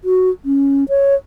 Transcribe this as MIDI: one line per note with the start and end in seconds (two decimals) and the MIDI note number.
0.04 0.30 66
0.45 0.84 61
0.89 1.15 73